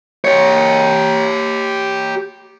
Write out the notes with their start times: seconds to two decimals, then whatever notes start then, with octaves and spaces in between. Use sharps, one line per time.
0.25 G4 C#5